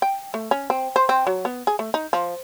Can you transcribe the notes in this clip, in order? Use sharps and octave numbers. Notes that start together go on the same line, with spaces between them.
G5
A3
C#4
C4
C5
C4
F#3
B3
G#4
A3
D#4
F3